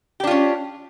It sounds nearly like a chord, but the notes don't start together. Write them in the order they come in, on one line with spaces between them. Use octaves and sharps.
G4 D4 F4 C#4